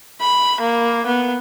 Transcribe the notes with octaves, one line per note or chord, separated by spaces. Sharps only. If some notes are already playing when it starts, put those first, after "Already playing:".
B5
A#3
B3